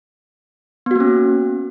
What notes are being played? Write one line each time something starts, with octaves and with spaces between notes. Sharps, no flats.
A#3 B3 C#4 F#4